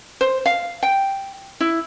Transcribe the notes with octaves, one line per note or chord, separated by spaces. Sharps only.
C5
F5
G5
E4